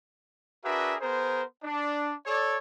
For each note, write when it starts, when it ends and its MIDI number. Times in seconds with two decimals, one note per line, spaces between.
0.65 0.95 62
0.65 0.95 66
0.65 0.95 68
0.65 0.95 70
0.65 0.95 71
0.65 0.95 76
1.01 1.43 59
1.01 1.43 68
1.01 1.43 70
1.01 1.43 72
1.63 2.13 62
2.26 2.57 69
2.26 2.57 73
2.26 2.57 74